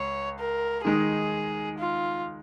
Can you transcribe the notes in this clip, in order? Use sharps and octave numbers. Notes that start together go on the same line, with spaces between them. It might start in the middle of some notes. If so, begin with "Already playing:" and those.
Already playing: C#2 C#5
A#4
D#3 G#3 D#4 G#4
F4